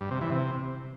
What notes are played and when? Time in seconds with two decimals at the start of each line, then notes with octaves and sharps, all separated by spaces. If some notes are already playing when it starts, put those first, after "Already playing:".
0.01 G2
0.11 C3
0.21 E3
0.31 C3